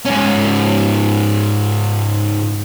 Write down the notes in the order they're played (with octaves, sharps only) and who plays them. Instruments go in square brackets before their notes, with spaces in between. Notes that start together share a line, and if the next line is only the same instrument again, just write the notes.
[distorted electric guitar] G#2 C#4